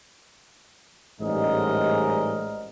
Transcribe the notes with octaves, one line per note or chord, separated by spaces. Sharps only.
A1 G#2 G3 G#3 A#4 D#5